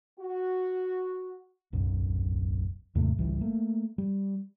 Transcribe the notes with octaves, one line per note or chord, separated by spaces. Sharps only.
F#4
D1 B1 F#2
D#2 G#2 C3 A3
G#1 C#2 E3 G3
A3 A#3
G3